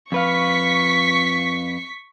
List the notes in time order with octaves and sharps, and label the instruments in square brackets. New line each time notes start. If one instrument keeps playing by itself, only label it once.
[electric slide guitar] F2 B4 F5 [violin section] C#6 B6